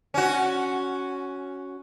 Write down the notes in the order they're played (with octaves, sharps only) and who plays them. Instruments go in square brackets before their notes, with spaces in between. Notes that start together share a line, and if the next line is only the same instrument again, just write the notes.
[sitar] C#4 F#4